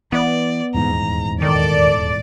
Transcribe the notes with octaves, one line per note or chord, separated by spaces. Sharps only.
E3 B3 D5
D#1 E2 G#2 A#5
D#3 A4 D5